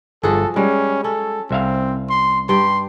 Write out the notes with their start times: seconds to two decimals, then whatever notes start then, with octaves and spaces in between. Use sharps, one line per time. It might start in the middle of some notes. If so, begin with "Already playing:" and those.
0.23 G1 F3 F#4 G#4 A4
0.56 G3 G#3 C#4
1.04 C#4 A4
1.51 C2 C4 E5 F5
2.10 C6
2.49 G2 G4 G5 C6